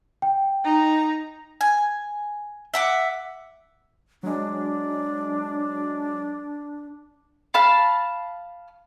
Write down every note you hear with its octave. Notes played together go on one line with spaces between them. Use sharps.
G5
D#4 A#5
G#5
E5 F#5 D6
F#3 G#3 D4
F5 A5 B5 F6